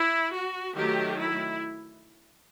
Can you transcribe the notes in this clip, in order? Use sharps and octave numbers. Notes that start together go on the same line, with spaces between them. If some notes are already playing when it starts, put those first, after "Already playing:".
Already playing: E4
F#4
D#3 F#3 A3 G4
E4